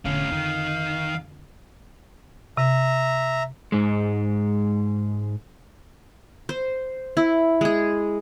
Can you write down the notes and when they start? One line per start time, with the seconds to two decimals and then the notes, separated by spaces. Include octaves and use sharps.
0.05 E1 A2 D3 C#4 F5
0.31 F2 D3 D#3
2.57 C3 E5 A#5
3.72 G#2 G#3
6.49 C5
7.17 E4
7.61 G#3 G#4